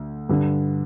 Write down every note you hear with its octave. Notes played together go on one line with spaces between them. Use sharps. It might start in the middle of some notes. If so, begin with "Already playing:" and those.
Already playing: D2
G2 D3